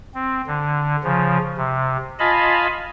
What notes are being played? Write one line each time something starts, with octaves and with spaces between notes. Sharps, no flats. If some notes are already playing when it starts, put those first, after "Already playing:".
C4
D3
C#3 F3
C3
F4 D#5 F5 G#5 A5 B5